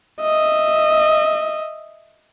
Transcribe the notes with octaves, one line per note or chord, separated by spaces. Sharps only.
D#5 E5